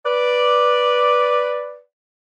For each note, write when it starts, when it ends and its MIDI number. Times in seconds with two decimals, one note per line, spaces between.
0.05 1.78 71
0.05 1.78 74